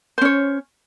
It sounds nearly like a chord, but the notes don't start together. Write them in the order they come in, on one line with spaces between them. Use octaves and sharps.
C5 C#4 C#5